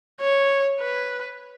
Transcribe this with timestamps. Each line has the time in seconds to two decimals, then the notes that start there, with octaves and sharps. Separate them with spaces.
0.20 C#5
0.80 B4